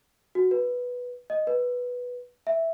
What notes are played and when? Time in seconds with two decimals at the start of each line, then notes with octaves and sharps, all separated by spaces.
0.35 F#4
0.51 B4
1.30 D#5
1.47 B4
2.47 E5